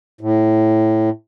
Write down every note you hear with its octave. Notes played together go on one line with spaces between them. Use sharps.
A2